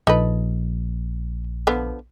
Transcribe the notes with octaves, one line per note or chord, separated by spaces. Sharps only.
A#1 D#4 A4 B4
D3 F3 B3